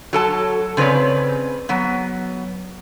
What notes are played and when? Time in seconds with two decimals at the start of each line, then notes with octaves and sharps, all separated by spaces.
0.13 F#3 A4 A5
0.77 C#3 C4 B4 C#5 D5
1.69 F#3 B3